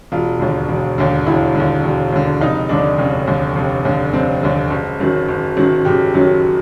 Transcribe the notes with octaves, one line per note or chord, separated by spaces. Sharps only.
E1 F4
D#2 D3
E1
D#2 D3
E1 E4
D#2 D3
E1
D#2 D3
F1 D#4
D#2 D3 D4
F1 C#4
D#2 D3
F1
D#2 D3
F1 C4
D#2 D3
F#1
F#2 D#3 F#3
F#1
F#2 D#3 F#3
F#1 G4
F#2 D#3 F#3